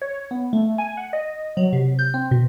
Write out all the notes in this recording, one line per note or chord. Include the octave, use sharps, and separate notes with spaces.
C#5
B3
A3
G#5
F#5
D#5
F#3
C3
G6
C4
B2